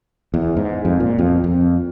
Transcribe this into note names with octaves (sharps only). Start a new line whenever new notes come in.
E2
G#2
F2
A#2
F2
F2